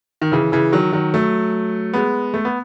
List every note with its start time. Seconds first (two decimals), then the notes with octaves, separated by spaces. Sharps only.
0.22 D#3
0.32 C#3 E3
0.52 C#3 E3
0.72 D#3 F#3
0.92 D#3 F#3
1.14 F#3 A3
1.93 G#3 B3
2.34 A3
2.45 B3